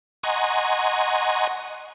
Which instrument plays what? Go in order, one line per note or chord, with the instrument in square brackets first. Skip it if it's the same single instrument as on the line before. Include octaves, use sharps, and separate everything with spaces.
[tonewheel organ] D#5 F#5 G#5 A#5 C6 C#6